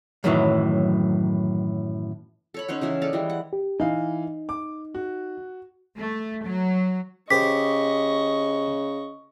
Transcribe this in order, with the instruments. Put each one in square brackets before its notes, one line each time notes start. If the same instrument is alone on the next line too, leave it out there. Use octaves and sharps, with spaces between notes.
[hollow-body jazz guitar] F#2 A2 D#3 E3 F#3
[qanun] A4 C#5 B5
C#4 D#4 C5 F#5
C#3 E3 G#4 E5
A4 D5 D#5 F5
E3 G3 G#3
F#5
[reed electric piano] G4
[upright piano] E3 F5 [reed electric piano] D#4
[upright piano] D6
F#4
[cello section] A3
F#3
[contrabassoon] C#3 [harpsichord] G4 C5 [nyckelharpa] D#5 C#6 [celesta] B6